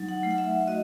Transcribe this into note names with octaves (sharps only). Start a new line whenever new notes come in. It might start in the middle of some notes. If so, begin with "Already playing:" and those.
Already playing: F#3 D#4
F#5
A3
F#5
E5
F#4 D#5